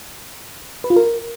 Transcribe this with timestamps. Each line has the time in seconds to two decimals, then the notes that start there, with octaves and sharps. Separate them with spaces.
0.84 B4
0.90 F4
0.96 A#4